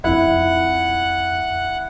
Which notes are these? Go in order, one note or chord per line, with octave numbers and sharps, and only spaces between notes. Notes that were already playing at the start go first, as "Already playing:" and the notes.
F2 D#4 E4 F#5 F#6